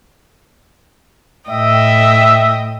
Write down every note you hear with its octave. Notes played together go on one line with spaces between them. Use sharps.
A2 D#5 E5 G5